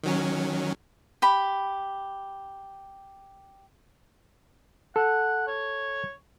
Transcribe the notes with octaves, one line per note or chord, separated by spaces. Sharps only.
D#3 F#3 C#4
G4 B5
A4 F#5
C#5